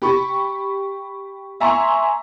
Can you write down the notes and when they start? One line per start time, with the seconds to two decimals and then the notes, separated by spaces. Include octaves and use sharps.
0.02 G4 B5 C#6
1.60 E5 G#5 A#5 C6 C#6